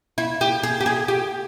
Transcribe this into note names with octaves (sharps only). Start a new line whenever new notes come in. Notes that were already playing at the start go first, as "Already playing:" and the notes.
E4
G4
G#4
G4
G#4
G4